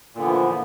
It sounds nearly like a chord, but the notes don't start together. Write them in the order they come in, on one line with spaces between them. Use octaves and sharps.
A#2 D3 B3 E3 F3